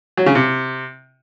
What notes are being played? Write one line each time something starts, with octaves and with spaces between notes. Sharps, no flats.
F#3
C#3
C3